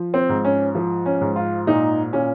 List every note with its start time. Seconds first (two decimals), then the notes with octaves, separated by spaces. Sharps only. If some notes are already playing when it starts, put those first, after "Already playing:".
Already playing: F3
0.14 C4
0.29 G#2
0.45 C#4
0.75 F3
1.06 C#4
1.21 G#2
1.36 F4
1.67 A#2 D#4
2.13 A#2 C#4